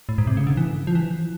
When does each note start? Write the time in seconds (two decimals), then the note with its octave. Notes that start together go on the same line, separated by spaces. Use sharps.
0.09 A2
0.18 G#2
0.27 C3
0.37 C#3
0.47 D3
0.57 E3
0.87 F3
0.95 E3